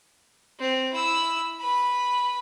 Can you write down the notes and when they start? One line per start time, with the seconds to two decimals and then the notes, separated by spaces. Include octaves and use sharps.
0.59 C4
0.93 E4 E6
1.60 B4 B5